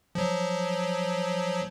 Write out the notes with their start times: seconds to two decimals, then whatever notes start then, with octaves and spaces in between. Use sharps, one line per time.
0.15 F3 F#3